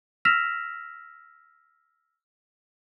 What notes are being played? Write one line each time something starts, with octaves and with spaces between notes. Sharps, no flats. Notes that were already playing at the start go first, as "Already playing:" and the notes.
E6 F6 A#6 B6 E7 F7